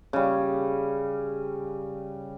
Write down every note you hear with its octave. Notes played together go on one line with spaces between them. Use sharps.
C#3 G3